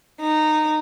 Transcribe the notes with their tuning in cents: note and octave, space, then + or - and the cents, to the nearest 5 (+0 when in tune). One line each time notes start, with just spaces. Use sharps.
D#4 -15